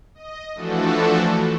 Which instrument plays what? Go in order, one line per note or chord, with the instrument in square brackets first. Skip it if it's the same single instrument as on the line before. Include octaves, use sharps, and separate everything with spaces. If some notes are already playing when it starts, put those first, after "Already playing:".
[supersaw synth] D#5
E3 F3 A3 D4 F#4 A4